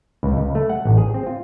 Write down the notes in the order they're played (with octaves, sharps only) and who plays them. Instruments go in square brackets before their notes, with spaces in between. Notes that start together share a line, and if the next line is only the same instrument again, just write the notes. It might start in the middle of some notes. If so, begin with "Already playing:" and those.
[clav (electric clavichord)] C#2
C#2
A3
F#5
A1
G#4
C4
F4